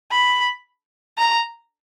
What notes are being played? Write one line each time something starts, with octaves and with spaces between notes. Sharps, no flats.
B5
A#5